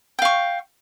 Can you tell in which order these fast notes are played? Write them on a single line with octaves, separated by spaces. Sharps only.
G5 F5 C#6